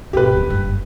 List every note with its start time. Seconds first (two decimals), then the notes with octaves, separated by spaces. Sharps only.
0.13 G#1 B2 G4 B4
0.34 D1 C#4
0.50 F#1 G2